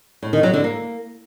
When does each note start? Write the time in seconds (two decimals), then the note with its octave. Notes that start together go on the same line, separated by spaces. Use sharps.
0.23 A2
0.33 D#3
0.43 F#3
0.54 D3
0.64 A#3